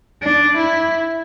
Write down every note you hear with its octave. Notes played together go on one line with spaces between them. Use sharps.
D4
E4